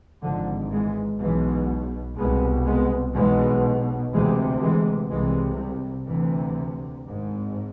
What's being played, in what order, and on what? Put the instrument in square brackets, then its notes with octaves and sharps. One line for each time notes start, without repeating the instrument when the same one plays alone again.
[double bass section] G#1 G#2 D3 F3
E3 G#3
B1 B2 E3 G#3
C2 B2 G#3 B3
G#3 B3
B1 B2 E3 G#3
D2 C3 E3 G#3
E3 G#3
C2 C3 E3 G#3
D2 C3 E3
G#1 G#2